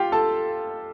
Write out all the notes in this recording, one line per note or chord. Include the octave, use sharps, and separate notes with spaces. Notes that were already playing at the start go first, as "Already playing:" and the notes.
Already playing: F4 G4 F5 G5
A4 A5